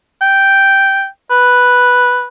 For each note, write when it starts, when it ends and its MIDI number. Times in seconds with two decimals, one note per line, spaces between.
0.22 1.06 79
1.31 2.27 71